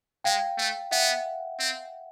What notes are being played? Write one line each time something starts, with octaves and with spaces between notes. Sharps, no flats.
G#3 F5 G5
A3
B3 E5 F#5
C4